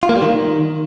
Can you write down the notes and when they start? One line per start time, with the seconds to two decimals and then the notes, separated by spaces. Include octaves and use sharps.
0.03 F4
0.09 A#3
0.16 G3
0.22 D#3